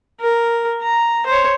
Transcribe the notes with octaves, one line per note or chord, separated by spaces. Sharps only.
A#4
A#5
C5 C#5